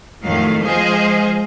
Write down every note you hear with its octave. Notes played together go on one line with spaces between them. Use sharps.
F2 A2 D#3 F#3 A3 F5
F3 G#3 G#4 C5 D#5 F5